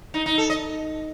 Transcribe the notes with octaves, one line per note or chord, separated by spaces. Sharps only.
D#4
D#4
A4
D#5